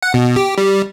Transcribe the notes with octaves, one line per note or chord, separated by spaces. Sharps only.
F#5
B2
G4
G3